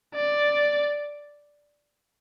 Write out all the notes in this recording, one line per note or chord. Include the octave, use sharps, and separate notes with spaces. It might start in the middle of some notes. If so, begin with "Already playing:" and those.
D5